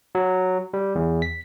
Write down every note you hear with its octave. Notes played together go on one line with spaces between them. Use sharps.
F#3
G3
E2
B6